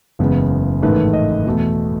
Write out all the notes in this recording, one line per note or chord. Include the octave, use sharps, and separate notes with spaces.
F#1 E2 C#3 G#3 B3
A1 G#2 D#3 A3 B4
D#5
E2 B2 A3